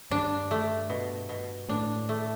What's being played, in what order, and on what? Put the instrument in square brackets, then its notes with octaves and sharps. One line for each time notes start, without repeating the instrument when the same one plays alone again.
[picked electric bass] G2 [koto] D4
[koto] A3
B2
B2
[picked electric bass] A2 [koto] D4
[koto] A3